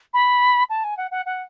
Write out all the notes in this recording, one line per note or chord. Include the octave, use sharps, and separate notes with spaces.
B5
A5
G#5
F#5
F#5
F#5